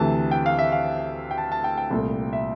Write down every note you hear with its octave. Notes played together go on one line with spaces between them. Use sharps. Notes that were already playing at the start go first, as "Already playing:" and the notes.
Already playing: D2 C3 E3 A3 A5
G5
F5
E5
F5
G5
A5
A5
G5
G5
C2 A#2 A3
E5